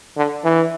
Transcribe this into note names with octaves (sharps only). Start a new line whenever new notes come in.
D3
E3